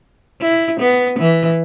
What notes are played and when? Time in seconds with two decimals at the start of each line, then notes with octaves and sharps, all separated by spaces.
0.41 E4
0.80 B3
1.19 E3